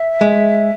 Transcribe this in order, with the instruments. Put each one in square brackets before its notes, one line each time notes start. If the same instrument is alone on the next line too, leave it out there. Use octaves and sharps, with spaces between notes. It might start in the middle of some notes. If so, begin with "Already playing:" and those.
Already playing: [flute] E5
[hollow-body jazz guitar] G#3